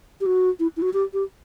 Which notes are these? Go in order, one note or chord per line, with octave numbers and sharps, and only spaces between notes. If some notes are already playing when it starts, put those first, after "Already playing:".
G4
F#4
E4
E4
F#4
G4
G4